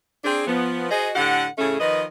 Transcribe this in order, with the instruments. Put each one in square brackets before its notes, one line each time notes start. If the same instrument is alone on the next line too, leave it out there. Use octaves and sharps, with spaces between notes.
[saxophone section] C4 D4 G#4
F3 B3
F#4 G#4 C5 D#5
A2 D3 G4 F#5
A2 C#3 A3 C#4 G#4 A4
D#3 F3 B4 D#5